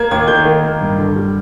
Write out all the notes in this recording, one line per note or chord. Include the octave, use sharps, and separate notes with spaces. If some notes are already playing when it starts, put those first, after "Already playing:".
Already playing: A#3 G#6
D#2 G#6
D#3 G6
D#3
A#3
G2
D3
G3